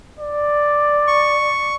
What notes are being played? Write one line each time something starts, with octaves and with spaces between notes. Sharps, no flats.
D5
C#6